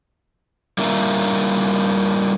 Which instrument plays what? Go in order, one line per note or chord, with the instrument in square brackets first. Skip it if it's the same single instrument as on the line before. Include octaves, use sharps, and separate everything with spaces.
[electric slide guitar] G3 A#3 D4 F4 A#4 E5